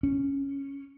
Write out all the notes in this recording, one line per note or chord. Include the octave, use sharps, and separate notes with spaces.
C#4